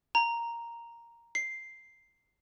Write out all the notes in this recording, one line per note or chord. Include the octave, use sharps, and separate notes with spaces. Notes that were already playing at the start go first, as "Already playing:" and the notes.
A#5
C7